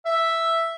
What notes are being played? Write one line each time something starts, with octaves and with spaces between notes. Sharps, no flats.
E5